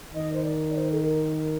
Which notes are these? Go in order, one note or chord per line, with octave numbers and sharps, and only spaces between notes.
D#3 D#5
C5
D5
D5
C5
A4
A#4